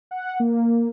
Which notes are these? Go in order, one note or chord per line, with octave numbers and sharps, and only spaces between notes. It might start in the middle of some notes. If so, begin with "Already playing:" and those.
F#5
A#3